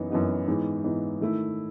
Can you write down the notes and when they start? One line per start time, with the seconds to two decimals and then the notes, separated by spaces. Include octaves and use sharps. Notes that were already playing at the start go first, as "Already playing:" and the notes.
Already playing: F#2 E3 B3 D#4
0.10 F#2 E3 B3 D#4
0.47 G#2 E3 B3 D#4
0.84 G#2 E3 B3 D#4
1.20 D#3 A3 E4